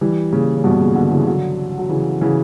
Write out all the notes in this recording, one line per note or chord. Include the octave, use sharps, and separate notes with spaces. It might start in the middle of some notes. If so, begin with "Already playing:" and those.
E3 G3
A#2 C#3
C#3
G2 B2
A#2 C#3
B2 D3
C#3 E3
D3 F#3
F#3
C#3 E3
C#3 E3